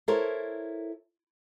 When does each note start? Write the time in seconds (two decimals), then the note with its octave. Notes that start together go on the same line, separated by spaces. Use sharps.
0.08 E4 A4 A#4 C5 C#5